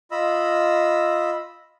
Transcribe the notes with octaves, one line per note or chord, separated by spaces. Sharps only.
F4 D#5 B5 E6